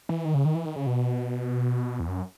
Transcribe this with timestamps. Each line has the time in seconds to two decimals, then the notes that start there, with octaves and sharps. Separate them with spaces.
0.09 E3
0.25 D#3
0.34 C#3
0.45 D#3
0.55 E3
0.65 D#3
0.76 C#3
0.87 B2
2.00 E2
2.08 F#2